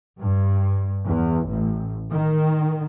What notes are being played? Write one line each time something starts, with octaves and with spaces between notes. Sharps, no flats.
G2
E2
A1
D#3